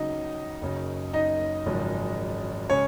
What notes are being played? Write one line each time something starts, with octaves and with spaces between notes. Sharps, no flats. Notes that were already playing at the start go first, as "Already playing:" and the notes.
Already playing: C#2 C#3 F#3 D#4 D#5
F#1 F#2 C#3
D#4 D#5
G#1 F#2 C#3 F3 G#3
C#3 G#3 C#4 C#5